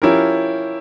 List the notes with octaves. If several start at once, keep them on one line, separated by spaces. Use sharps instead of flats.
F3 C#4 E4 G4 A#4